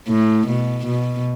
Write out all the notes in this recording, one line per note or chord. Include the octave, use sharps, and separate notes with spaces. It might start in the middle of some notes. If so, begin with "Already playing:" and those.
A2
B2
B2